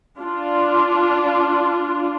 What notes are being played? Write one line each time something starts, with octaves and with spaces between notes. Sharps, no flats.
D4 F4